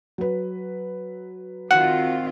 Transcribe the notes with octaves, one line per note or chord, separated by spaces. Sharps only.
F#3 B4
D#3 C4 F4 F#4 F#5